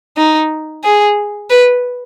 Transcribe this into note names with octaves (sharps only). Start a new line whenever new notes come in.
D#4
G#4
B4